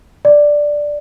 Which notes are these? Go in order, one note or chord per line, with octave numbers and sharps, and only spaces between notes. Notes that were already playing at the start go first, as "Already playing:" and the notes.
D5